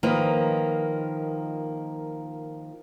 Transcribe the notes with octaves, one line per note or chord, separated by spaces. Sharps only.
D#3 F3 A#3 A#4 B4 D#5